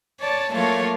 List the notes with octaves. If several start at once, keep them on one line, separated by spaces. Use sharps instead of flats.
C#5 D5 A5
F#3 A3 A#3 F4 C#5